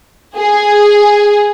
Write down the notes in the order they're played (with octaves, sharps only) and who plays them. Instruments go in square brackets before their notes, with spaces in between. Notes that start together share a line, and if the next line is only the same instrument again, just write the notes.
[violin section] G#4